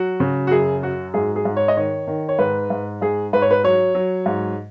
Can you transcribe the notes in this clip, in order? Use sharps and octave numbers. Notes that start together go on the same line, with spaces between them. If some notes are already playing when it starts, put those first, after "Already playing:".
Already playing: F#3 F#4
C#3
F#4
F#2 G#4
F#3 F#4
G#2 G#4
G#4
G#2
C#5
D#5
D#3 C#5
D#3
C#5
G#2 B4
G#2
G#2 G#4
G#2 B4
C#5
B4
F#3 C#5
F#3
G#2